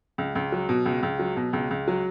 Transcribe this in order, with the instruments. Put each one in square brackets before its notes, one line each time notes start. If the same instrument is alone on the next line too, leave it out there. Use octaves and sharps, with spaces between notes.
[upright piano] C#2
C#2
F#3
B2
C#2
C#2
F#3
B2
C#2
C#2
F#3